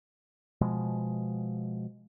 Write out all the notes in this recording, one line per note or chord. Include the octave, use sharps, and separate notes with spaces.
B2 F3 G#3